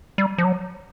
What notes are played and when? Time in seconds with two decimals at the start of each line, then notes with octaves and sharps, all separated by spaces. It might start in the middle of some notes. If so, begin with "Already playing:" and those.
0.18 G3
0.38 F3
0.44 F#3